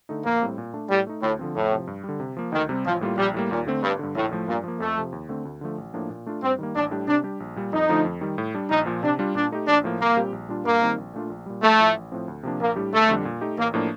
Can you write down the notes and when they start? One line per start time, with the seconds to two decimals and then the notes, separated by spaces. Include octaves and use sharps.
0.09 D3 A3 D#4
0.25 A#1 A#3
0.42 A2 G3 C4
0.58 A#2
0.74 A3 D4
0.90 A2 G3
1.07 A3 D#4
1.22 D2 A2
1.39 D3 F3 C4
1.55 F2 A2
1.72 C3 F3
1.87 G2
2.04 D3 G3
2.20 C3
2.37 F3 A#3
2.52 D2 D#3
2.69 C3 G3 C4
2.85 A1 F3
3.01 A2 G3 A#3 F4
3.18 A#1 G3
3.34 A2 G3 A#3
3.50 D#2 A#2
3.67 D3 A3 C4
3.83 G1 G2
3.99 G2 D3
4.15 A#1 A2
4.31 A2 F3 A3
4.47 G2 A#2
4.64 F3 A#3
4.80 F2 A3
4.97 C3 F3
5.12 D#2
5.29 D3 A3 C4
5.45 D2
5.61 D3 F3 A3
5.78 A1
5.94 A2 F3 A#3 D4
6.10 A#2
6.26 A3 D4 F4
6.43 G2 C4
6.59 D#3 G3 A#3
6.75 A1 D4
6.91 A2 G3 D4 G4
7.08 C3 D4
7.24 G3 D4 G4
7.40 A#1
7.56 A#2 G3
7.73 F2 D#4
7.89 D3 F3 A3
8.05 F2
8.21 D#3 G3
8.38 A2
8.54 G3 D4
8.70 A#1 D#4
8.86 A#2 F3
9.03 C3 D4
9.19 G3 D4 F4
9.35 A#2 D4
9.52 A3 D#4 G4
9.68 A#1 D4
9.84 A2 F3 A#3
10.00 C2 A#3
10.17 A#2 G3 C4 G4
10.33 A#1
10.49 A#2 G3 D4 F4
10.65 G2 A#3
10.82 D#3 G3 C4 D#4
10.98 A#1
11.14 A#2 A3 D4 F4
11.30 A#1
11.46 A#2 G3
11.63 A#1 A3
11.79 A2 F3
11.95 A1
12.12 A2 F3 C4
12.28 D2
12.43 C3 F3 A#3 D4
12.60 A#1 A#3
12.76 A2 G3 D4 G4
12.93 G1 A3
13.09 F2 D3 G3 D4
13.25 A#2
13.41 A3 D#4 G4
13.58 A1 A#3
13.74 A2 F3 A#3 D4